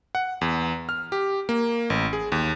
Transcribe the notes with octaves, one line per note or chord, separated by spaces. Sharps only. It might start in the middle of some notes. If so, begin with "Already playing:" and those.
F#5
E2
F6
G4
A#3
A1
G#4
D#2